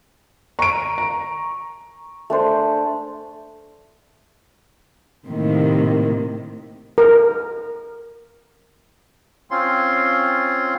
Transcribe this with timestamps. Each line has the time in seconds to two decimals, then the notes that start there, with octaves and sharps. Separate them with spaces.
0.59 A#5 C#6 D7
0.98 A#5
2.30 A3 D4 C5
5.27 A2 C3 D#3 A#3
6.98 A#4
9.51 C4 C#4 F4 C6